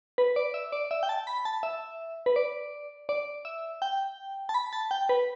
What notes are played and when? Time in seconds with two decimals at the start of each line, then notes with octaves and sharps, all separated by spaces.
0.18 B4
0.36 D5
0.54 E5
0.72 D5
0.91 E5
1.03 G5
1.09 A5
1.27 B5
1.45 A5
1.63 E5
2.26 B4
2.36 D5
3.09 D5
3.45 E5
3.82 G5
4.49 A5
4.54 B5
4.73 A5
4.91 G5
5.09 B4